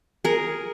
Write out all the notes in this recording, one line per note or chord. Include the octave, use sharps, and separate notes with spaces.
G#4 A#4